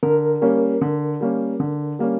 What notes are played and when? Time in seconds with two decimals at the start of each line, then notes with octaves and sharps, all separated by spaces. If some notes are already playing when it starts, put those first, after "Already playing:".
0.03 D3 A#4
0.41 G3 A#3 C#4
0.81 D3
1.21 G3 A#3 C#4
1.60 D3
1.99 G3 A#3 C#4